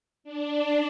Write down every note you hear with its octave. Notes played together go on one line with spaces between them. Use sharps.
D4